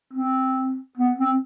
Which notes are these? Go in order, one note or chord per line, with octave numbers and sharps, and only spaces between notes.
C4
B3
C4